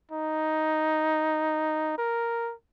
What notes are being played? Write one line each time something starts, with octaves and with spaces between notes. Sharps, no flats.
D#4
A#4